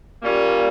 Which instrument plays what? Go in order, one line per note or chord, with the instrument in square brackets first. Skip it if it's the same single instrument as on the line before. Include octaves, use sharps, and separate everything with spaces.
[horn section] A#2 G3 A#3 C#4